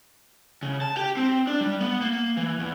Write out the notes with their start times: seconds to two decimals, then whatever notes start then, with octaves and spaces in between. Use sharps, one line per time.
0.63 C#3
0.82 A5
0.97 G4
1.17 C4
1.47 D4
1.61 G3
1.81 B3
2.01 A#3
2.37 E3
2.60 E2